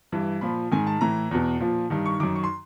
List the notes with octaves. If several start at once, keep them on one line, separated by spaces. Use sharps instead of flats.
G2 E3
A#2 F3 B5
G#2 D#3 G#5
A5
A2 E3 A#5
E2 B2
A#2 F3
G2 D#3
C#6
F#2 D#3 D6
C#6
C6